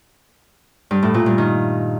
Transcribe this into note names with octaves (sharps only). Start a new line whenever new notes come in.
G2
A2
A#2
G2
D#3